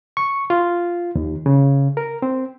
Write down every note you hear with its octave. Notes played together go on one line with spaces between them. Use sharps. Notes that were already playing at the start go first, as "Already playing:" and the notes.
C#6
F4
D#2
C#3
A#4
C4